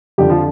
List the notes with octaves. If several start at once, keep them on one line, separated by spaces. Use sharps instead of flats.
F2 D3 F3 G3 G4
F3 F4